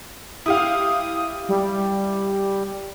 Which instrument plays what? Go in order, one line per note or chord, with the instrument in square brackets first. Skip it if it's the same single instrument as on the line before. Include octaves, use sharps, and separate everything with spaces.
[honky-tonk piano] E4 G4 F5 [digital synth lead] D#6
[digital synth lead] G3